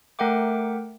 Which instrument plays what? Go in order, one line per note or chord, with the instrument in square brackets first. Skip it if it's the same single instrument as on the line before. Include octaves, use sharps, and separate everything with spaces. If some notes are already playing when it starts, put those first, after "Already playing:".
[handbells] A3 A#4 E5 F#5 G5 D6